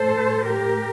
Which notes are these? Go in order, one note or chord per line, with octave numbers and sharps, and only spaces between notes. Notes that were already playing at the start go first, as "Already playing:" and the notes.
Already playing: A2 A4 C5
G4 A#4